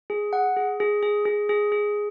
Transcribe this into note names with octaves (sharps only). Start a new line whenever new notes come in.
G#4
F#5
G#4
G#4
G#4
G#4
G#4
G#4